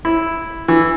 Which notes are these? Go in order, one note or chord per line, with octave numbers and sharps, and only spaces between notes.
E4
E3